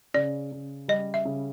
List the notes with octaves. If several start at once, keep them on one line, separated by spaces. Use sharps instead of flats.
C#3 D5
C#3
G3 D#5
E5
C#3